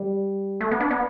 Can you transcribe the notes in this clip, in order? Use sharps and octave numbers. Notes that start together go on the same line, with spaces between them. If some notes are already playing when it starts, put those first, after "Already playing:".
Already playing: G3
A3
B3
D4
B3